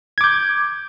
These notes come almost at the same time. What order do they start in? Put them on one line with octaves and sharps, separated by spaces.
G#6 D6 G6